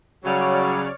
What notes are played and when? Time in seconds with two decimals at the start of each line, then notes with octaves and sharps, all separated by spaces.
0.24 C#3 F#3 G3 F#4 C#5 D5 F6